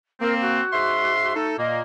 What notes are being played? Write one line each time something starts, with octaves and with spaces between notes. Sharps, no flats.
A#3 C4 A#4
F#4
G#2 E5 C6
A3 D#4 A4
A#2 A#3 D#5